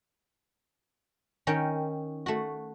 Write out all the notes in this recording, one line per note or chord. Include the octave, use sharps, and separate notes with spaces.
D#3 C#4 A#4 G5
A3 F#4